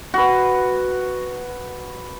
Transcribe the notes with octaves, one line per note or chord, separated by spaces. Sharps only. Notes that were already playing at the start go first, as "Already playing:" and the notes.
F#4 B4